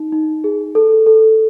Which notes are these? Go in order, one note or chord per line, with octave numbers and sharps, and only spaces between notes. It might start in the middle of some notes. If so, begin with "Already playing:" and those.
Already playing: D#4
D#4
G#4
A4
A4